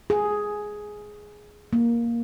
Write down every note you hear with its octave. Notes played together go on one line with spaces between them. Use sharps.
G#4
A#3